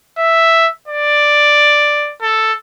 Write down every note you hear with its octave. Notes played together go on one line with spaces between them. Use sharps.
E5
D5
A4